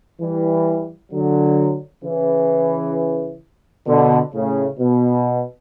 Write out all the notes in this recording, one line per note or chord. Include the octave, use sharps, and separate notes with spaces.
E3 G3
D3 F#3
C#3 E3
B2 D3
A2 C#3
B2